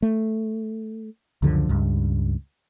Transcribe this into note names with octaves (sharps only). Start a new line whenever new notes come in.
A3
C#2 F#2 D3 F3
C#2 G2